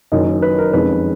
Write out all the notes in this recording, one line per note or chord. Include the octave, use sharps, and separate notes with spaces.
F#1 F#2 D#3 D#5
B4
A#4
F2 D#3 G#3 C#4 B4